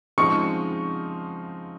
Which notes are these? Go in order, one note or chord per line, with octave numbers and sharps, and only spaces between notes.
C#3 F3 G#3 C4 D#4 C#6